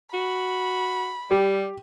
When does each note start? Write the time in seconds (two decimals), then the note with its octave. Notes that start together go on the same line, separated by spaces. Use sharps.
0.14 F#4 B5
1.31 G3 G4